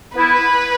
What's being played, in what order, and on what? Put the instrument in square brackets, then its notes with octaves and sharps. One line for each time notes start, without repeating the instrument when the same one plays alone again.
[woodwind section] B3 E4 [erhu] B4